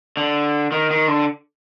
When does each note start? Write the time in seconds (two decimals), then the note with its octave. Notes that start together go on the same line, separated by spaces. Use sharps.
0.17 D3
0.72 D#3
0.91 D#3
1.08 D3